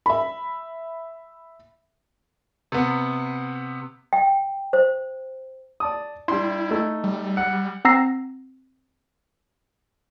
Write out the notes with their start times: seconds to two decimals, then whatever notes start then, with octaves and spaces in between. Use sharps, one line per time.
0.06 E5 B5
2.72 C3 B3
4.13 G5
4.73 C5
5.80 D5 A5 D#6
6.28 G3 D4 E4 C6
6.69 A3 D#4
7.04 G3
7.37 F#5
7.85 C4 F#5 A#5 E6 A#6 C7